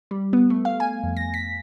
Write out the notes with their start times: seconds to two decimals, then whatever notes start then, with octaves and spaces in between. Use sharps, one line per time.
0.11 G3
0.33 B3
0.50 A3
0.65 F5
0.80 G#5
1.03 F2
1.17 A#6
1.34 B6